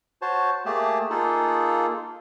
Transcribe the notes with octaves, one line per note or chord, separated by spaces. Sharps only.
F#4 C5 C#5 A5
A3 A#3 G4 G#4 A5
A#3 D#4 F4 G#4 A4